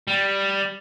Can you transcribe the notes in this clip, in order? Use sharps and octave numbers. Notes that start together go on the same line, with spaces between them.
G3